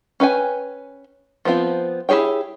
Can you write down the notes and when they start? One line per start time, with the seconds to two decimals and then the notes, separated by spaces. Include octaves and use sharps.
0.20 C#4 B4 G5 G#5
1.45 F3 B3 C4 F4
2.09 E4 G4 G#4 C#5 G5